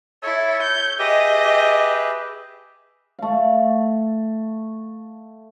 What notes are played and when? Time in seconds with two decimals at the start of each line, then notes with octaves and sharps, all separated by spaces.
0.23 E4 A4 C#5
0.62 G6
0.99 G4 G#4 B4 D#5 E5
1.45 G4
3.19 A3 F5